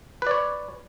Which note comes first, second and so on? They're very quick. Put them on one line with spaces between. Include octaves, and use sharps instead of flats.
B4 D5 C#5